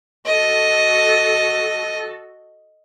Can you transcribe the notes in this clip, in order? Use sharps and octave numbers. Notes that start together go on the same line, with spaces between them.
F#4 A4 D#5